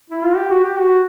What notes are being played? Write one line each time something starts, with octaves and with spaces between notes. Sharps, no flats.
E4
F4
G4
F#4
G4
F#4